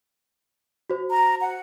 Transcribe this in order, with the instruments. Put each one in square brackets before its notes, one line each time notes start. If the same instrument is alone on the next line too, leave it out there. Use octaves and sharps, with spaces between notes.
[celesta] F#4 C5
[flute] A#5
F#5